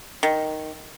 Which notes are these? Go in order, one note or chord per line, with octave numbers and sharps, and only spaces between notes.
D#3